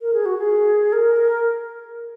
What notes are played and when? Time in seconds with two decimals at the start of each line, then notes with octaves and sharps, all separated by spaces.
0.02 A#4
0.14 G#4
0.26 F#4
0.38 G#4
0.93 A#4